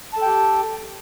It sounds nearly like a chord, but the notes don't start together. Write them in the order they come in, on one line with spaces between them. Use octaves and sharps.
A5 A4 G5 G4